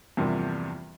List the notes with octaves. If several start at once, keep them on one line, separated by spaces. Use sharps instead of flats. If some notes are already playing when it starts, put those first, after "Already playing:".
E2 G2 C3 F3 G3 A#3